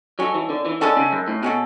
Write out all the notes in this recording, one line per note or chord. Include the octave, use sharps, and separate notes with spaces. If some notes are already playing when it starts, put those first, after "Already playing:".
F#3 G#3 C#4 F#4 A4
E3
D3
E3
D3 G#3 C#4 F#4 A4
C#3
F#2
A2
B2 G#3 C#4 F#4 A4